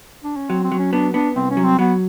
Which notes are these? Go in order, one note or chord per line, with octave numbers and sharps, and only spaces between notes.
D4
C#4
F#3 C4
C4
F#3
C#4
B3 D4
B3 D4
C2 C4
C#4
F#3
C4
F#3 B3